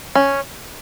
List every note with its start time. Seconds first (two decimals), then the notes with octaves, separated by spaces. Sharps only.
0.15 C#4